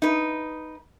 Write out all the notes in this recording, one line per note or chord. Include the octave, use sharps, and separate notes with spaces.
D#4 B4